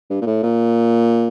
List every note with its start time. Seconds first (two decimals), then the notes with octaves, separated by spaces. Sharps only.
0.10 G2
0.21 A#2
0.26 A2
0.43 A#2